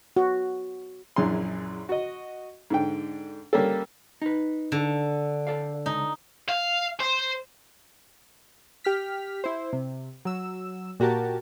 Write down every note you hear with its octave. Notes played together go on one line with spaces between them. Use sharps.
F#4
A#1 F#2 E3 G#4 C6
F#4 D#5
G#2 D3 G5
G3 A#3 C#4 A4
D#4 B4
D3
A4 D5 F5
C#2 D#4
F5
C5
G4 F6 B6
E4 C5
C3
F#3 E6
A#2 F#4 G4 A#4 A5